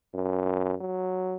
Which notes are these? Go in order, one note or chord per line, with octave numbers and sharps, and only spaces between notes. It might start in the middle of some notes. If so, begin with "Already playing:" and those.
F#2
F#3